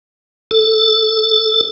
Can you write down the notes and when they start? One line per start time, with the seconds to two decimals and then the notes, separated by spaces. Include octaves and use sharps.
0.51 A4